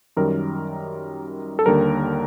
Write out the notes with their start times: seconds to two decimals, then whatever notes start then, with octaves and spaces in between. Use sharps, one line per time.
0.17 F#2 D#3 G3 A#4
1.59 A4
1.66 D#2 D3 G3 A#4